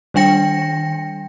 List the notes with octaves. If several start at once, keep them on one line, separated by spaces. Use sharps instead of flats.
D#3 G3 D4 G5 A#6 C#7